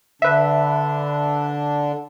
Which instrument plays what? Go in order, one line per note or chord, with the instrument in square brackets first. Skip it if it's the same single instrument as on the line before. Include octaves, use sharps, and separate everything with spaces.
[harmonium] D3 D4 [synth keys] B4 E5